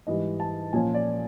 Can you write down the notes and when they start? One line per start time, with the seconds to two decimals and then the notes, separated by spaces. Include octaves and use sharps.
0.07 G#2 E3 G3 D#5
0.40 A5
0.73 A#2 F3 A#3 C#4 F4 G#5
0.94 D5